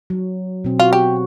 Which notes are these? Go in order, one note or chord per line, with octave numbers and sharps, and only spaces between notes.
F#3
B2 C4
F4 F#4
G4